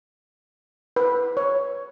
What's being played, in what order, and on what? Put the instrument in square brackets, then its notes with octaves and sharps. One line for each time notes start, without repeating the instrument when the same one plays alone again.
[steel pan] B4
C#5